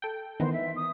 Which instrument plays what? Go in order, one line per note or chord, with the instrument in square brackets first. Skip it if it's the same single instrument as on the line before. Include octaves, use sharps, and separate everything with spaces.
[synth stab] A4 G5
[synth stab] D#3 E3 B3 [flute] C5
[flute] E5
D#6